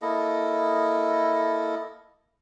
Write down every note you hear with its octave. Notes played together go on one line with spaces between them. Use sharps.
A#3 E4 A4 D#5